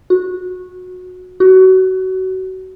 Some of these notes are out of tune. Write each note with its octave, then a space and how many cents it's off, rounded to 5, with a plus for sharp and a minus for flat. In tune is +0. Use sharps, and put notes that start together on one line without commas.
F#4 -20
F#4 +25